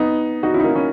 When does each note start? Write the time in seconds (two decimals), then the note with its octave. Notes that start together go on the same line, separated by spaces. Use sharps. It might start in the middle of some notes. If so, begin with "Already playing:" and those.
Already playing: B3 D#4
0.43 D#4 F#4
0.54 C#4 E4
0.60 D#4
0.64 A#3 C#4
0.75 C#4 E4